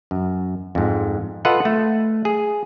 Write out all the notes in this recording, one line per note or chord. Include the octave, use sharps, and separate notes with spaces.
F#2
F2 G#2
F4 A4 B4 D#5 F#5
A3
G#4